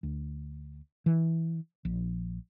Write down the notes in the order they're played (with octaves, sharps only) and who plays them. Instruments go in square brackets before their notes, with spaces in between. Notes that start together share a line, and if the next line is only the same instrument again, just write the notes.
[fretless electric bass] D2
E3
A#1